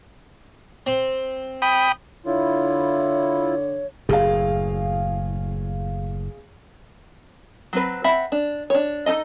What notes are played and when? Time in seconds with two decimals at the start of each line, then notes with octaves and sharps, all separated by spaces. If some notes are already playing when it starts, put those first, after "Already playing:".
0.87 C4
1.62 G5 B5 D#6
2.26 D3 E4 F4 C#5
4.09 F#1 A2 G#4 F5
7.73 F#3 C4 B4
8.04 C4 E5 F#5 B5
8.32 D4
8.70 D4 C#5
9.06 D#4 F4 A4 D#5